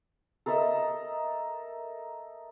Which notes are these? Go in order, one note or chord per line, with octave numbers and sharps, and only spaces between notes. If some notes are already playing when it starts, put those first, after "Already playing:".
A4 A#4 D#5 E5